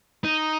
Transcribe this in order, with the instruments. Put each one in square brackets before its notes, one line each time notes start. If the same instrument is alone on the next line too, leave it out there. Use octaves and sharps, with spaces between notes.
[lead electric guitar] D#4